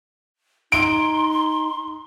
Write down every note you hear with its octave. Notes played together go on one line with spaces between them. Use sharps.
D#4 C6 D7